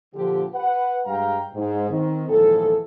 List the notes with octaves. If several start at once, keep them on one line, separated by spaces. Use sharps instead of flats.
A#1 A#2 D3 F3 G4
B4 F#5
G2 G#3 F5 G5 A#5
G#2
D#3 C4
G#1 E2 A#2 E3 F3 A4